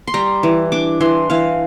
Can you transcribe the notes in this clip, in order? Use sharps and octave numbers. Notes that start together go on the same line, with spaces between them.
C6
G3 A#5
E3
D4 D6
E3 C6
E3 F5